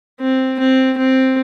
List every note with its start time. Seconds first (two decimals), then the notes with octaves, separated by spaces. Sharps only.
0.20 C4
0.59 C4
0.98 C4